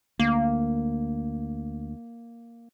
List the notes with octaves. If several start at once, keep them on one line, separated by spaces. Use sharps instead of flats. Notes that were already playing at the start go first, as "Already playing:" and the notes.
D2 A#3